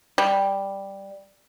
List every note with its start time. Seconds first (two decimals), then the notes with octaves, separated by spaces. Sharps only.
0.18 G3